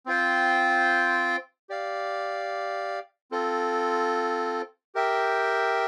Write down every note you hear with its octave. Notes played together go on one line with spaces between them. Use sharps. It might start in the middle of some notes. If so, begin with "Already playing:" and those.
C4 F4 C5 G5
G4 D5 F5
C4 F4 A4
G4 A#4 E5 G5